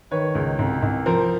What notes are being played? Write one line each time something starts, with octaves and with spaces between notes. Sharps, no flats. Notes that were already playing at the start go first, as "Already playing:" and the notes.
D#3 B4 C#5
C#2
C2
C2
F3 A#4 C5